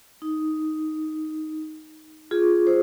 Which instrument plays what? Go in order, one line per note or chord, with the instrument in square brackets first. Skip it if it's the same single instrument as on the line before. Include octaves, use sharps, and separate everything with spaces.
[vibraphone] D#4
F4 G#4
G#4 C5